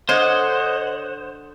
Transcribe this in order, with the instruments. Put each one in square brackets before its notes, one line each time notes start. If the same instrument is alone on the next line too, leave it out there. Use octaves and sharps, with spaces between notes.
[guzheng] D3 [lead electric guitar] C5 [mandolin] C#5 D#5 [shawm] F#5